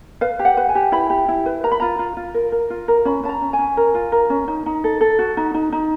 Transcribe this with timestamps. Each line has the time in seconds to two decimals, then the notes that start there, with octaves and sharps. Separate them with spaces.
0.21 B4 F5
0.39 G4
0.45 F#5
0.57 B4
0.69 G#5
0.75 G4
0.92 E4 B5
1.10 G4
1.28 E4
1.46 B4
1.63 A#4 A#5
1.72 B5
1.80 F4 A#5
1.99 F4
2.17 F4
2.34 A#4
2.52 A#4
2.70 F4
2.88 A#4
3.05 C#4 B5
3.24 C#4 A5
3.29 A#5
3.41 C#4
3.53 G#5
3.59 C#4
3.77 A#4
3.94 F4
4.12 A#4
4.30 C#4
4.48 D#4
4.66 D#4
4.84 A4
5.01 A4
5.19 F#4
5.37 D#4
5.54 D#4
5.72 D#4